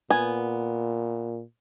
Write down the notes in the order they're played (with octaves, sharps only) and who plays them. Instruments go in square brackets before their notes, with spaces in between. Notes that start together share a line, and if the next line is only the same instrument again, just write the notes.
[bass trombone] A#2 [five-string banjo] B3 G#5